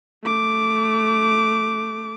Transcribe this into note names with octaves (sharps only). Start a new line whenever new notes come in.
A3 D6